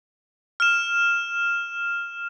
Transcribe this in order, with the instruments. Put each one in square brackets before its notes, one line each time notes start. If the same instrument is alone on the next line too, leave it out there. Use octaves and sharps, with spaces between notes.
[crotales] F6 E7